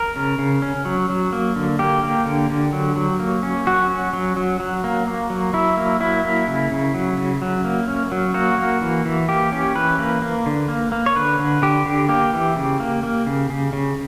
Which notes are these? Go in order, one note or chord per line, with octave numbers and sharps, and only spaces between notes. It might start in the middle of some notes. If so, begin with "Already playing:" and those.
Already playing: A#4
C#3
C#3
C#4
F#3
F#3
A#3
D3
A#3 G4
A#3
D3
D3
F#3
F#3
A#3
C#4
F#3 F#4
C#4
F#3
F#3
F#3
A#3
A#3
F#3
F#3 E4
A#3
F#3 E4
A#3
C#3
C#3
F#3
C#3
F#3
A#3
C#4
F#3
A#3 F#4
A#3
E3
E3
A#3 G4
C#4
E3 B4
A#3
A#3
D3
A#3
A#3
C#5
D3 B4
D3
D3 G4
D3
A#3 G4
E3
C#3
A#3
A#3
C#3
C#3
C#3